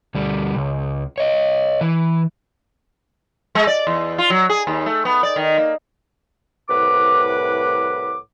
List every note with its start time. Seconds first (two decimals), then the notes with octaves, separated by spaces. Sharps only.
0.15 D2 G3
0.56 C#2
1.18 C#5 D#5
1.81 E3
3.55 G#3
3.67 D5
3.87 E2
4.18 F4
4.30 F#3
4.50 G#4
4.67 D#2
4.86 A3
5.05 B3
5.23 D5
5.36 D#3
5.58 A#3
6.69 C2 A2 B4 F#5 D6